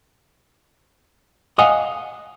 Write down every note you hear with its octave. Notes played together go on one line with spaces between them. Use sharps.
D#5 F5 F#5 G#5